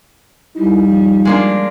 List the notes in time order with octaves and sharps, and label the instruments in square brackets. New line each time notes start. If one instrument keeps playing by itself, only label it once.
[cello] G3 [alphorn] D#4 [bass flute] E4
[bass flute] F3
[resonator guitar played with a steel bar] G#3 A#3 D4